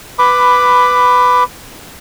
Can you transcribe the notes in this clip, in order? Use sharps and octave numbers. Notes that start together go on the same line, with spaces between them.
B4 B5 D6